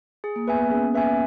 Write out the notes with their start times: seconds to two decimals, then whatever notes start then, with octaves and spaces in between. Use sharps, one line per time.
0.24 G#4
0.36 A#3
0.47 B3 B4 E5 G#5
0.59 A#3
0.71 C#4 G#4
0.94 B4 E5 G#5